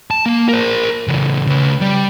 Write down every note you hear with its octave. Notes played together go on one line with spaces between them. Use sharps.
A5
A#3
A#4 C5
C#3 E3
C#3 B4
G3